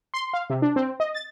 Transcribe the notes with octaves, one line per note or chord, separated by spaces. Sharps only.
C6
F5
C3
D4
C4
D#5
A6